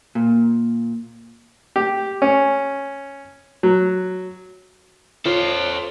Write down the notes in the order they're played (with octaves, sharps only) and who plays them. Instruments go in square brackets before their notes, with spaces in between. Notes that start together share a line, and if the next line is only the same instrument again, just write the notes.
[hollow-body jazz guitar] A#2
[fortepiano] G4
C#4
F#3
[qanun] F4 [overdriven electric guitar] A4 C5 [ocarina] C#5